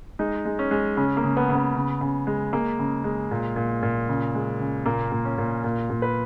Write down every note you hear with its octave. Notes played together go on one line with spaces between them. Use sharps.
G#3 D#4
G#3
C#4
G#3
C#3 C#4
A#3
C#3
B3
C#3
B3
C#3
C#3
G#3
G#3 A#3
C#3
G#3
A#2
A#2
A#2
C#3
G#3
C#3
A#2 A#3
A#2
C#4
A#2
A#2
A#2
B4